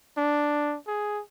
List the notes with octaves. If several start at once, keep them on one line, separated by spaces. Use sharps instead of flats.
D4
G#4